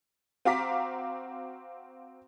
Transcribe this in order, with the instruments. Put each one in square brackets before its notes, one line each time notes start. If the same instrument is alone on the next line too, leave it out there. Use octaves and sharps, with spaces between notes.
[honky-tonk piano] C4 F#4 F5 A#5 D6 B6